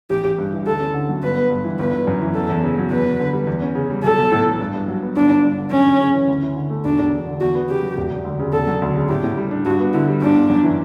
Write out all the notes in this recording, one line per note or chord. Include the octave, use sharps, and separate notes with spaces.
A1 G4
A1
G2
E3
D2 A4
C#4
D3
F#3
G1 B4
B3
G2
E3
G1 B4
G1
F#2
E3
E2 A4
E2
C#3
F#3
E2 B4
E2
D3
G3
E2
C#4
C#3
G3
B1 A4
B1
A2
E3
G2
G2
F#3
B3
G1 D4
G1
G2
D3
F#2 C#4
F#2
C#3
E3
D2
E4
D3
A3
E1 D4
E1
E2
D3
E2 F#4
B3
C#3 G4
F#3
E1
E1
D2
C#3
E1 A4
F#3
D2
C#3
A2 G4
A2
G3
D4
G2 F#4
B3
D3 E4
G3
G1 D4
G1
F#2
E3